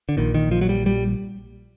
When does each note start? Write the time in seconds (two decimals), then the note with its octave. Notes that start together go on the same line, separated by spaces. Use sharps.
0.09 D3
0.17 A#1 A#2 D#3
0.34 D#3
0.51 F3
0.61 F#3
0.69 G3
0.86 G3